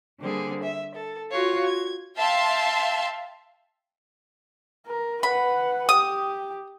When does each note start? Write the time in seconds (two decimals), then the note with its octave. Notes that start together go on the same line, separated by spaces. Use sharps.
0.20 D3 G3 A#3 C4 G#4
0.63 E5
0.95 A4
1.31 F4 F#4 C#5 F5
1.66 G#6
2.16 E5 F5 G5 A5 C6
4.87 A#4
5.23 B4 F#5 B5
5.89 G4 D#6